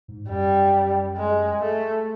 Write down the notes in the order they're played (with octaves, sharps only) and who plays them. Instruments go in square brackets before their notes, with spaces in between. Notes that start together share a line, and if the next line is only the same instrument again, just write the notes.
[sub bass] G#2
[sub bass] F#2 [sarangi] G3
[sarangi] G#3
A3